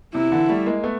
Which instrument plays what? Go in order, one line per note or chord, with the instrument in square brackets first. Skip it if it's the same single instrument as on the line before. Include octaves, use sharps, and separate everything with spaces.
[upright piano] C3 [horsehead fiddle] E4
[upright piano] D3 E3
G3 A3
G#3 A#3
A3 B3